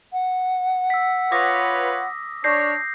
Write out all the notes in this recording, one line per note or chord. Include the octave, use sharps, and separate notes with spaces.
F#5
E6 B6
F4 B4 C#5 D6 D#6 A#6
D4 C#5 G6 A#6 C7